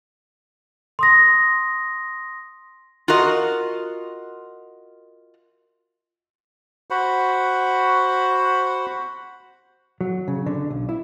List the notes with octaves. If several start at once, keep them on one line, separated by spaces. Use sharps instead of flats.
C6 D#6 A#6
F4 F#4 A#4 D#5
F#4 C5 F#5 B5
F#3
C#3
D3
B1
E4